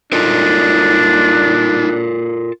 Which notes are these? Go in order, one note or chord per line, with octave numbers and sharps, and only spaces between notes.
G3 D4 D#4 F4 A4 A#4